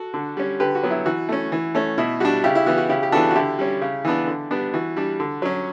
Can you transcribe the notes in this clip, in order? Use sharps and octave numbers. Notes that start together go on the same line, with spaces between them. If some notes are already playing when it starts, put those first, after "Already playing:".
Already playing: F#4 A4
D3
G3 C#4
D3 G4 B4
F#4
F#3 B3
E4
E3 F#4
A3 C#4
E3
A3 C#4
B2 E4
G3 D4 F#4
C#3 E4 G4
E4
E3 B3 F#4
F#4
C#3 E4 G4
G4
E3 B3 D4 F#4 A4
F#4
D3 E4 G4
G3 C#4
C#3
E3 B3 D4
D3
G3 B3 D4
E3 F#4
G3 D4
D3
F#3 C#4